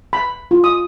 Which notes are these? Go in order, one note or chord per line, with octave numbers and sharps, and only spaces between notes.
B5
F4
D#6